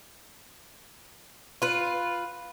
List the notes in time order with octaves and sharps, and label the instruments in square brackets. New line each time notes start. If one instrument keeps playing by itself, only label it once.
[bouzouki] F4 B4